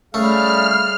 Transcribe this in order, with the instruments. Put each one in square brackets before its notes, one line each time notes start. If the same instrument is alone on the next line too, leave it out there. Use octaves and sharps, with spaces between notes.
[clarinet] G3 [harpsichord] A3 [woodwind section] C#4 G#4 F5 [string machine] F6